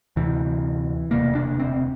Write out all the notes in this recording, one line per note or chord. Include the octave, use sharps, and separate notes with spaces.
D2 C3 E3
E1 D2 C3 A#3
D4
C4